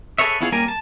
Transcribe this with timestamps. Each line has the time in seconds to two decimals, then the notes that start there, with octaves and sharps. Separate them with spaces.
0.18 G#4 A4 B4 C#5 E5
0.41 B3 C#4 E4 F4 G#4
0.52 G3 A#3 C#4 A#4 G#5
0.68 A5